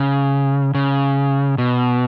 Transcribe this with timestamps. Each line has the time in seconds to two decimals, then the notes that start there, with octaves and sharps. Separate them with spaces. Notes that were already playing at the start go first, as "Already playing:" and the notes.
Already playing: C#3
0.75 C#3
1.58 B2